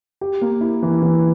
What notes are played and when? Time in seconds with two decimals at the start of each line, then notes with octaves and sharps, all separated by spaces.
0.21 G4
0.41 A#3
0.61 E4
0.83 E3
1.02 E3